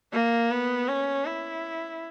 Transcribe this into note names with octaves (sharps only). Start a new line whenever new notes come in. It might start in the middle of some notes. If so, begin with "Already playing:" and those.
A#3
B3
C#4
E4